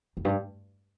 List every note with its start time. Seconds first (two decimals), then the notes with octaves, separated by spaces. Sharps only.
0.17 F2
0.25 G2